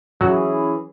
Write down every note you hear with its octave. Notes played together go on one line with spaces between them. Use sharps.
E3 F#3 C#4 E4 F#4 G#4